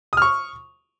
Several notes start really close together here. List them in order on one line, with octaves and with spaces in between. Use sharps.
D#6 F6 C#6